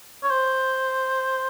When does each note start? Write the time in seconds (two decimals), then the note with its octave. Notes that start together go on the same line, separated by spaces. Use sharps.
0.23 C#5
0.30 C5